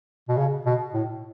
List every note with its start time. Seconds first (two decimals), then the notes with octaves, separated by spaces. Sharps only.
0.29 B2
0.37 C#3
0.66 B2
0.94 A2